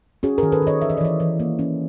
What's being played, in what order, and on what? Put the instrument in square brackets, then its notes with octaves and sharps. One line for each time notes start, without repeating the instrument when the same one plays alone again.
[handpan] C#4 F#4 G#4
G#4 A#4
D#3
A4 B4
D#3 C#5 D#5
E3 E5
D#5
D5
E3 C#5 D#5
E3
A#3
C#4